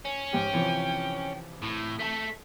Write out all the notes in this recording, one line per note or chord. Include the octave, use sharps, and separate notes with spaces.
C#4
G#2 G4 G5
C3 E3 F3
A2
A3 A4 B6